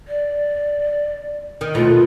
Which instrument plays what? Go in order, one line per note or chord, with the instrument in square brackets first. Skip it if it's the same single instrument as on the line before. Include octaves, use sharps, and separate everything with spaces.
[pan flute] D5
[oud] D#3
[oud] D#2 B2 A3 [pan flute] F4